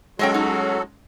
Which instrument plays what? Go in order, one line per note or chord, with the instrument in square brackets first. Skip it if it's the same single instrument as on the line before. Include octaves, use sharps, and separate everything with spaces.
[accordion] F#3 F#4 A4 [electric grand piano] G#3 C#4 [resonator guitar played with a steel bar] D#5 E5 G5
[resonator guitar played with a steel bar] A2 D#4